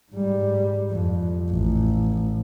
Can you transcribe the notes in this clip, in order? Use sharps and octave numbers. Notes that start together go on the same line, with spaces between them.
G#2 G3
F2
A1